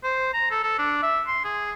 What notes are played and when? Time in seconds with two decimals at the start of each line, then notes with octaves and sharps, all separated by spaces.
0.04 C5
0.34 A#5
0.51 A4
0.63 A4
0.79 D4
1.03 E5
1.27 C6
1.45 G#4